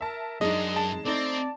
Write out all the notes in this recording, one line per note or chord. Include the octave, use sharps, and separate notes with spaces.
A#4 E5 A5
F#2 G#3 D4 D#4 D#5
A5
A3 C4 D#4 D5